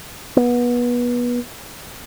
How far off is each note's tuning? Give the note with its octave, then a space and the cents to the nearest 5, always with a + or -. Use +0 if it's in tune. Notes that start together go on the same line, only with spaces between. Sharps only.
B3 -25